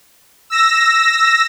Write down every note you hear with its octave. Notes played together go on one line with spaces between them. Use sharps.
E6 A#6